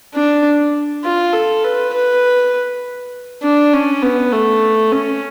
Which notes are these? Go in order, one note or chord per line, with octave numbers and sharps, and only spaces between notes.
D4
F4
A4
B4
B4
D4
C#4
B3
A3
C#4